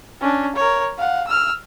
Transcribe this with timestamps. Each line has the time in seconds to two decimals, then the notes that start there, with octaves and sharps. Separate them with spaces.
0.21 C#4 D4
0.55 A#4 C#5
0.97 F5 F#5
1.27 E6 F6